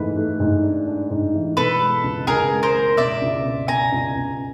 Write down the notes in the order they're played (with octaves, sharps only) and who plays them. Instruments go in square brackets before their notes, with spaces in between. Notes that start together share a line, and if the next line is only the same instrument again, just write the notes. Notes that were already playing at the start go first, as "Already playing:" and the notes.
Already playing: [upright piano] G#2 E3 A3 [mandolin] B4
[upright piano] A3
G#2
D4
D4
G#2
E3
[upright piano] B2 [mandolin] A4 B4
[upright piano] G#3
C#2
[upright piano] C#2 [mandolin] G#4 A#4
[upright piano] G#3
[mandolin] A#4 C5
[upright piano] G#3
[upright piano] B2 [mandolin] D5 E5
[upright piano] C#2
B2
[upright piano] B2 [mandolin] G#5 A#5
[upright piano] C#2
C#2